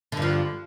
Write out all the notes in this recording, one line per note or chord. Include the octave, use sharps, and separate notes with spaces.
G2 D3 F3